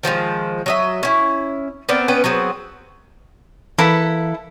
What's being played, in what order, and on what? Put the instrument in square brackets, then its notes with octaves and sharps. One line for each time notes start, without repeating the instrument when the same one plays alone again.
[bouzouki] D#3 F3 F#3 G#3
F#3 D#5 E5
C#4 E4
B3 C4 A#4 D5
B3 C#4 B4 G5
F#3 B3 C4 G#4
[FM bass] E3 [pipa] A#3 B4 [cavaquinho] E4 A4